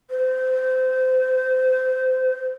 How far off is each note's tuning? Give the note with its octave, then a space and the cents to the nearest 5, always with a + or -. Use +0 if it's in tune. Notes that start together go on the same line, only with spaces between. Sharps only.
C5 -25